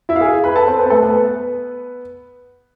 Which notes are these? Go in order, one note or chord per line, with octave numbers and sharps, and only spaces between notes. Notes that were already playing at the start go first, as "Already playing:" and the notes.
E4 E5
F5
G#4 G#5
B4 B5
A4 A5
C4 C5
B3 B4
A3 A4
B3 B4